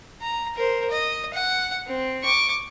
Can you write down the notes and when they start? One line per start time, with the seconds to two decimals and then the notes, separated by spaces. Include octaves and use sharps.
0.21 A#5
0.55 A#4 C5
0.90 D#5
1.33 F#5
1.87 C4
2.23 C#6 D6